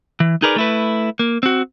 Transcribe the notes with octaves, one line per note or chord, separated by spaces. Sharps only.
E3
D#4 G#4 A#4 B4 D5
A3 E4 B4
A#3
C4 F#4